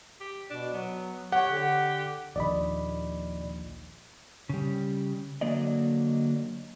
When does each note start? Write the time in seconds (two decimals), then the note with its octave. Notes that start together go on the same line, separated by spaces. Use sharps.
0.20 G4
0.50 B2 D4
0.74 F#3 B3
1.32 G4 C#5 F#5
1.50 D3
2.36 A#1 D#2 D5 D#5 B5
4.49 C#3 G3
5.41 D3 F#3 A#3 D5 D#5